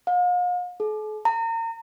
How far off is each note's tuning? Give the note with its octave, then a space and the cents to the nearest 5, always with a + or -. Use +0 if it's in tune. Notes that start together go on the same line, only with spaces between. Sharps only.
F5 +40
A4 -45
A#5 -35